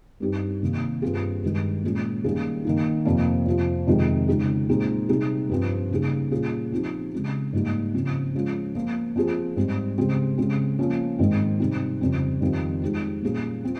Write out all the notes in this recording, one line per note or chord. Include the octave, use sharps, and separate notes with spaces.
G2 G3 C4 D#4 G4
C3 D#3 G3 A#3
G2 G3 C4 F4 G#4
G2 D#3 G#3
A#2 G#3 C#4
D#3 G3 A#3 C#4 G#4
D#3 A#3 D#4
F2 C3 F3 A#3
F2 C3 F3
F2 C3 D#3 G#3
C#3 G#3 D#4 G#4
A#2 G#3 C4 D#4 G#4
C3 G3 C4 D#4 G#4
G2 F3 C4
C#3 G3 A#3 D#4 G#4
A#2 G3 C#4 F4 G#4
F3 C4 D#4 G4
C#3 G#3 C4
G#2 G3 A#3 D#4
C#3 F3 C4
F3 G#3 C#4 F4
F3 A#3 F4
F3 C4 F4 G#4
G#2 G3 C4
C#3 G#3 C4 G4
C#3 G#3 C4
F3 A#3 C#4
G#2 D#3 G#3 C4
C3 G3 C4 D#4
F2 C#3 G3 C4
F2 D#3 G3 C4 F4
F3 G#3 D#4 G4
A#2 G3 A#3 C#4 G#4
C4 F4